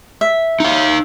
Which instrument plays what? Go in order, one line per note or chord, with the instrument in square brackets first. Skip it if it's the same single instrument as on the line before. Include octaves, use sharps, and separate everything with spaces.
[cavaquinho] E5
[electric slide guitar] D#4 F5